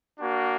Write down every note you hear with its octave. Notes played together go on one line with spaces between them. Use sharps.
A#3 D4 F#4